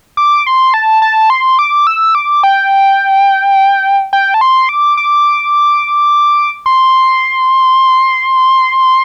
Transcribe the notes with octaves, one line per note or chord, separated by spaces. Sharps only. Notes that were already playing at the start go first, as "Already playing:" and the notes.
D6
C6
A5
A5
C6
D6
E6
D6
G5
G5
A5
C6
D6
D6
C6